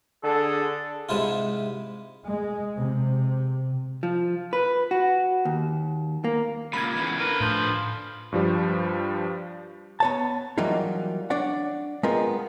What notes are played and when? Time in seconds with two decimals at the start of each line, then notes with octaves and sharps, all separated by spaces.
0.24 D3 G#4 A4
1.09 G#2 C3 G#3 E4 F4
2.27 G#3
2.77 C3
4.03 F3
4.53 B4
4.91 F#4
5.45 D#2
6.24 A#3
6.73 C#2 A#2 B5 G#6
6.97 E2 C#3
7.19 D3 A#4 B4
7.41 A2 F3 G6
8.32 G2 F3 G3
10.00 B3 C#5 A5
10.58 E3 F#3 G3 A#3 D#4 F4
11.30 D4 C#5 D5 F#5
12.03 G#3 B3 C4 F4 A#4